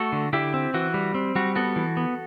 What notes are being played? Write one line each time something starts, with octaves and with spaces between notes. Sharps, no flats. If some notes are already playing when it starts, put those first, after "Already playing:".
Already playing: A3 F#4 A4
D3
D3 E4 G4
C4
E3 F#4
G3
C4
G3 F#4
B3 F#4 A4
E3
B3